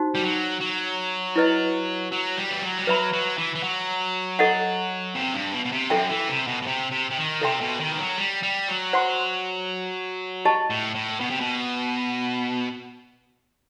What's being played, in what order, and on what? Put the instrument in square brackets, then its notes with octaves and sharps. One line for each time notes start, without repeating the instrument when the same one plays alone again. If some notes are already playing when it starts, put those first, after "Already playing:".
Already playing: [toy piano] D#4 F#4 C5
[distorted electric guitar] G3
F#3
F#3
[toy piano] E4 B4 D#5
[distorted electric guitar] F#3
G3
E3
F#3
G3
[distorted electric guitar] F#3 [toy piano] B4 E5 B5
[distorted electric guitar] F#3
E3
E3
F#3
[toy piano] A4 D#5 F#5
[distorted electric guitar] C3
G2
B2
B2
C3
[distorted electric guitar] F#2 [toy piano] A4 E5 G5
[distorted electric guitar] E3
C3
B2
B2
C3
C3
C3
D#3
[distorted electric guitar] C3 [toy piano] A4 E5 G5 C6
[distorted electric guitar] B2
D#3
E3
F#3
G3
G3
F#3
[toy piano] C5 F#5 C6
G4 D#5 A5
[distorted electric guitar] A2
A2
B2
C3
B2